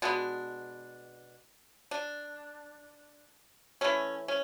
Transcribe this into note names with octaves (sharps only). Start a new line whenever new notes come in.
B2 G#3 B3 D4
D4
E3 A3 C#4
C#4